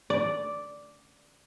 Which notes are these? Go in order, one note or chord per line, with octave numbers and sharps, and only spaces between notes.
D5